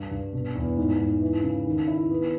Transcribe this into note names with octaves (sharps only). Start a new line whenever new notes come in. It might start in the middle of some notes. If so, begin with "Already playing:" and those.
Already playing: G2
G2
B2
E2
G#2
G#2
E3
C#3
D#3
E4
B3